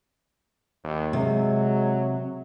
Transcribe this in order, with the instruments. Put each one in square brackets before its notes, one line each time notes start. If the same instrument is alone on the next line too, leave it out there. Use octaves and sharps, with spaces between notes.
[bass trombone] D#2
[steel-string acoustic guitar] C3 [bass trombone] F#3 [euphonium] G#3